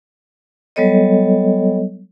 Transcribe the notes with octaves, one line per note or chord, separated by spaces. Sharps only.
F#3 G3 B3 A4 C#5 D#5